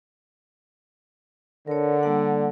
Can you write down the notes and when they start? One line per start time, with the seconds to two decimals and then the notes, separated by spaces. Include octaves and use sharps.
1.67 D3 A#4 C#5
2.03 G3 A#3 F#5